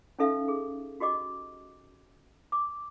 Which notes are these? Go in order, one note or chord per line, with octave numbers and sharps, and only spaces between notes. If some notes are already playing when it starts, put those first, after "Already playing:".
C#4 D#4 A4 E5 F5
G#4
F#4 G4 D#5 D6
D6